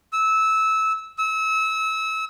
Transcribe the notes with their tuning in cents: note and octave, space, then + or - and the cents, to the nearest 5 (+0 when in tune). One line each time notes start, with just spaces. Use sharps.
E6 -20
E6 -30